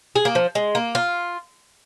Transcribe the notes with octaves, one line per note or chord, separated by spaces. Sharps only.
G#4
A#3
F3
G#3
A#3
F4